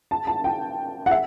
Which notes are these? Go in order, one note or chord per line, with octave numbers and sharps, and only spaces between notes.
A5
A5
G5
F#5
E5